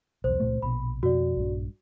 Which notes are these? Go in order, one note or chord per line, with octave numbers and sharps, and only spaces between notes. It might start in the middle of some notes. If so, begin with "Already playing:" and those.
B1 E2 C5
C#2 A#2 A3
A#1 B2 B5
F2 B2 F#4 D5
A#1 G2